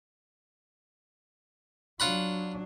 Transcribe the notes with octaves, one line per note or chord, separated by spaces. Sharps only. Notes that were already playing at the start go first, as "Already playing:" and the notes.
F#3 D4 F4 F#5 B5